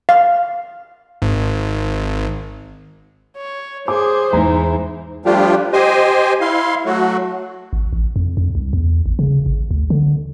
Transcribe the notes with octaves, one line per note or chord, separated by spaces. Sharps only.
F5
G#1
C#5
G#4 C5 D6
E2 G#2 E3 G#3 A#5
F3 G3 A3 D4 F4 G4
G4 C5 D#5 G#5
E4 F5 C6
F#3 A3 F#4
G#1
A1
F2
F2
C2
E2
G#1
C#3
G#1
D2
D3